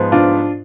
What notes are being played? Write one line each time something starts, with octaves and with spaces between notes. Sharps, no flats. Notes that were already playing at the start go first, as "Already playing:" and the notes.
Already playing: G#2 F3 B3
D4 F4